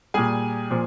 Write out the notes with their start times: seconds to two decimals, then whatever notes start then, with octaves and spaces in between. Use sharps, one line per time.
0.14 A#2 G3 G#4 G#5
0.71 A#2 F3